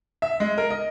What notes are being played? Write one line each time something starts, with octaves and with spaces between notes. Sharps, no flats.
E5
G#3
A#4
D#5